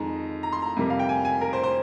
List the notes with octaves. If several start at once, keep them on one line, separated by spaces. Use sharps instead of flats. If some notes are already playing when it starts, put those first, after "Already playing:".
Already playing: F2 D#3 G#3 D#4 A#5
A#5
C6
A#5
F2 C3 G3 A#3
F5
G5
G#5
G#5
A#4
C5
C5